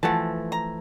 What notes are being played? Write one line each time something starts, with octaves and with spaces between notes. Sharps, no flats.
E3 F3 A3 F#5 A5
A#5